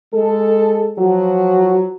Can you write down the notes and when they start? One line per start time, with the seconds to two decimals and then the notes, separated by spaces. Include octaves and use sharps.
0.14 G#3 A4
0.99 F3 F#3 F#4